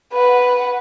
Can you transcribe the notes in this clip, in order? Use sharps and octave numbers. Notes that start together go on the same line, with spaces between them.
B4 F#5